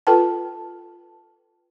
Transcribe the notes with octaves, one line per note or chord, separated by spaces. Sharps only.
F4 A4 B4 G5 A5